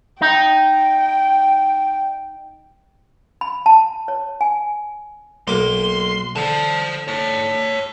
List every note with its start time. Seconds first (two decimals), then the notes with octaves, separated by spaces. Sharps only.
0.21 D#4 G5
3.41 B5
3.66 A5
4.08 C#5
4.41 G#5
5.48 B1 A#3 C6 D6
6.36 D3 C5 A5
7.08 C#5 A5